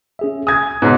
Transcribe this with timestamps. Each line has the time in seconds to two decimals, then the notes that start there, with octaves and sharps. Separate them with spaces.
0.19 C#4 G#4 E5
0.47 G#5 D#6 G#6
0.82 G#2 B2 B4 C#5